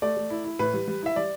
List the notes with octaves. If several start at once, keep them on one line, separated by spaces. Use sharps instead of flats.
A3 D5
A3
E4
E4
A2 B4
G3
G3
E4 E5
G3 D5